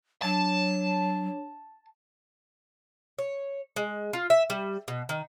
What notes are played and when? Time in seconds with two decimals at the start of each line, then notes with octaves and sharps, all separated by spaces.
0.22 F#3 D4 C#5 A5
3.18 C#5
3.76 G#3
4.13 F4
4.30 E5
4.50 G3
4.88 B2
5.09 D#3